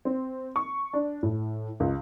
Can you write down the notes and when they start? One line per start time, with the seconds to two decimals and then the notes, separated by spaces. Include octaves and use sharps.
0.05 C4
0.56 C#6
0.93 D4
1.23 A2
1.80 C#2